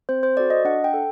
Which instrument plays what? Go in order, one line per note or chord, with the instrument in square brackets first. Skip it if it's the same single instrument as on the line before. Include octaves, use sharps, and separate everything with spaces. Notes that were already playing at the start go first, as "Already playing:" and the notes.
[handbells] C4 C5
C5
F#4 A4 D5
D#5
D4 F#5
G5
A4